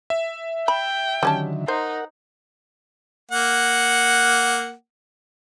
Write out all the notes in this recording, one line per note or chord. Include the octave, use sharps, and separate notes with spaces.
E5
G5 B5
D3 D#3 F#3 G3 C#4 A5
D#4 A#4 C5 F#5
A#3 F#5